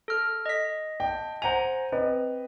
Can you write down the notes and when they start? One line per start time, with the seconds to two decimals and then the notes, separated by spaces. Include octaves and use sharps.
0.08 A4 F6
0.46 D#5 B6
1.00 G5 A5
1.42 C5 F#5 G#5 A#5 F7
1.92 C4 B4 D#5